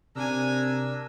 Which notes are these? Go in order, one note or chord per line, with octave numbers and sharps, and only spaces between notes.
C3 D4 A#4 G#5 A#5 E6